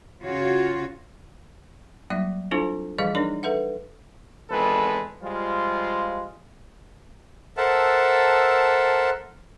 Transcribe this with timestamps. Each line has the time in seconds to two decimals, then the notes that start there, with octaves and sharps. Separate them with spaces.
0.23 C#3 F4 F#4 C#5
2.10 F#3 G3 A#3 D5 E5
2.51 C4 D4 E4 F4 A4 C5
2.98 E3 F3 G3 G#4 D#5 F5
3.15 D4 D#4 A#4 C#5 D5
3.43 A4 B4 E5 F#5
4.50 G#1 E2 G#3 A4 B4
5.22 F3 G3 G#3 F4
7.57 A4 A#4 C5 E5 F#5 A5